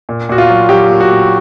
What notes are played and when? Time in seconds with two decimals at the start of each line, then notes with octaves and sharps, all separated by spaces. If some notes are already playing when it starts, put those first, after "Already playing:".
0.09 A#2
0.29 A#2 F#4
0.38 F4
0.50 F#3
0.69 F#3 G4
0.90 A#2
1.00 F#4
1.10 A#2